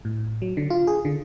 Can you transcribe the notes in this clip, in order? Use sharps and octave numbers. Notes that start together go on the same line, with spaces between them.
A2
F#3
D3
F4
G#4
D3